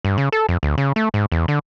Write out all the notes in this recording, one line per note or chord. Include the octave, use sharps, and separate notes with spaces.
G2
C#3
A4
F2
D2
C#3
A3
G#2
E2
D3